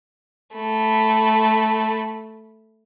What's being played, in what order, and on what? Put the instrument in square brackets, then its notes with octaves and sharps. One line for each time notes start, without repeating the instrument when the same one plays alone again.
[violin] A3 B5